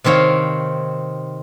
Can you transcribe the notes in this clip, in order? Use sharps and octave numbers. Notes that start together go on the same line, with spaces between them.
C3 D#3 C4 C#5 F5